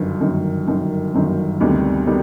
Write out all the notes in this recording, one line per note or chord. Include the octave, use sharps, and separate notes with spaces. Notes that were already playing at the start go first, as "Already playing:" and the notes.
Already playing: G1 F#2 D#3
G1 F#2 D#3
G1 F#2 D#3
G1 F#2 D#3
D2 C3 D#3 G3 B3
C3 D#3 G3 B3